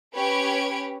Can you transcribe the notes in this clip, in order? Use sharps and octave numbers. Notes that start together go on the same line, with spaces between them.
C#4 G4 B4 C#5 G#6 D7